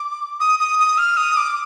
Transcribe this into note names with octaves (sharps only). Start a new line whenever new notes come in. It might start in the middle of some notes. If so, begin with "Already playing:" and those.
Already playing: D6
D#6
D#6
D#6
F6
D#6
D6